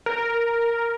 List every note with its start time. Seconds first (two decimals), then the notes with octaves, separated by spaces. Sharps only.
0.06 A#4